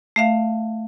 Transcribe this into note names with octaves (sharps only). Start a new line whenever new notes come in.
A3 E5 F5